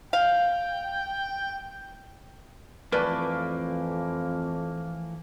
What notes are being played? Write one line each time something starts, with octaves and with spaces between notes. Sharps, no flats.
F5 G5
F2 E3 A3 A#3 B4 D5